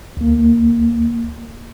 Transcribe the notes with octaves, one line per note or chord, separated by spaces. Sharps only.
D2 A#3